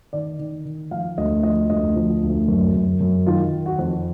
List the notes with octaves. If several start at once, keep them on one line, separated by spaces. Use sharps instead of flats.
D#3 D5
D#3
D#3
F3 F5
D2 D#5
F3 D#5
D2 D#5
F3
D2
F#2
F#2
F#2
D#3 F4
D#3
F#4
F2